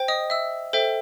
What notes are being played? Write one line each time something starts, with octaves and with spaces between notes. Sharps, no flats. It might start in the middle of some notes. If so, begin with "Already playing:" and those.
Already playing: C5 G5
D#5 D#6
E5 E6
A4 C5 E5 G5